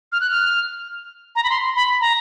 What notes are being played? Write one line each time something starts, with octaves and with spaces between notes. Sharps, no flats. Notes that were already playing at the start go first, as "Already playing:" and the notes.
F6
F#6
F6
A#5
B5
C6
B5
A#5